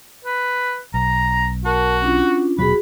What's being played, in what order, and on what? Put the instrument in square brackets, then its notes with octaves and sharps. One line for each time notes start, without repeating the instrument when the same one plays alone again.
[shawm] B4
[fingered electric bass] B1 [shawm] A#5
[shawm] F#4 [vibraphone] A#4 A5
[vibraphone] C#4 D4 F4
[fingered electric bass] D#1 B2 F#3 [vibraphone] F#4 G#4 [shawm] B5